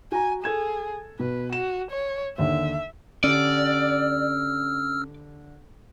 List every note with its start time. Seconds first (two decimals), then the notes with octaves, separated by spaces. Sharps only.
0.12 F#4 G#5 A#5
0.44 G#4 A4 G#6 E7
1.19 B2 B4
1.53 F#4 E7
1.91 C#5
2.38 D#2 D3 E5
3.24 D3 C#4 G4 D5 E6 F6